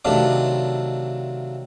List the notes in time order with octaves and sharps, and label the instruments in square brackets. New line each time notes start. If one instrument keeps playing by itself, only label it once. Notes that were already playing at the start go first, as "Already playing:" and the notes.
[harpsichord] C3 D#3 F#3 A3 D4 F4